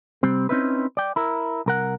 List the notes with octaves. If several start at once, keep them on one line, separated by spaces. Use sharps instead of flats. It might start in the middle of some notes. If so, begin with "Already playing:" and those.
C3 G3 C4
C4 C#4 D#4 E4 B4
D5 G5
E4 A#4
C2 A#4 F#5